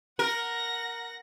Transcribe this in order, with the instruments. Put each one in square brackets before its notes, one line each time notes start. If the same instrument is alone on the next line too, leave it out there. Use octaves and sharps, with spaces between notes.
[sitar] A#4 [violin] F#5 A#6